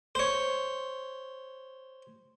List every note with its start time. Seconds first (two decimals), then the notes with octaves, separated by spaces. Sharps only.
0.15 C5 C#5